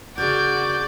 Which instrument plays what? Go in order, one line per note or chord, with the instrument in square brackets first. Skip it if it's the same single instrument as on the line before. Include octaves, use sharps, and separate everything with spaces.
[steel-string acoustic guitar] C#3 A#4 [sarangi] F#4 [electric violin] D5 [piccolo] G6